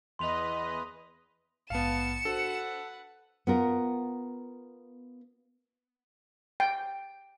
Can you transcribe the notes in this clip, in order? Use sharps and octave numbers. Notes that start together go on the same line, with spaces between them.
E2 B4 D#5 C6 F7
A#1 G#2 B3 F5 A5 C#7 E7
D4 F#4 A4 B4 C5 F#5
B3 F4 A#4
G5